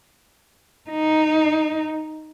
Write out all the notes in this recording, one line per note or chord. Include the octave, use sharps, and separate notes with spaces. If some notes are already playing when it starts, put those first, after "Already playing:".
D#4